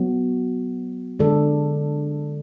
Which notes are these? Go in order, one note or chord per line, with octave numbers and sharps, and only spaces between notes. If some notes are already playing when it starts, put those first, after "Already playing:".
Already playing: F#3 B3 F#4
D3 G#3 D4 A4 D5